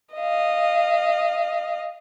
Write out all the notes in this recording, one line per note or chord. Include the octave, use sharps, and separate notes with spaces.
D#5 F5